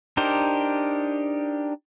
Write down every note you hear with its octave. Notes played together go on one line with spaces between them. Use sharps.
D4 D#4 G4 A#4 C5